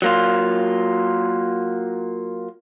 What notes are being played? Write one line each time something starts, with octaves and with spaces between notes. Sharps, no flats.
F#3 A#3 F4